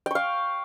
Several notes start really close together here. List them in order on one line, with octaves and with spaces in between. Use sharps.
G5 C#6 F5